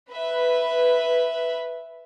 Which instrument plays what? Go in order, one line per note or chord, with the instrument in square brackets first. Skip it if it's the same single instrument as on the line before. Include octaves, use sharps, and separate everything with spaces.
[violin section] B4 [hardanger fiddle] E5 B5